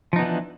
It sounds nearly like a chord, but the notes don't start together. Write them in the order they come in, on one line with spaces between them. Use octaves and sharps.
F3 D#4 B3 E3 D4